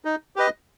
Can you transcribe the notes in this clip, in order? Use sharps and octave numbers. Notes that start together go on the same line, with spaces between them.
D#4
G4 B4 D#5